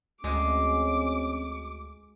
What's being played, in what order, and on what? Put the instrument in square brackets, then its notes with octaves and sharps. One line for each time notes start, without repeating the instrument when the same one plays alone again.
[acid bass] D2 [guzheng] G#3 [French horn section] C4 C#4 [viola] D6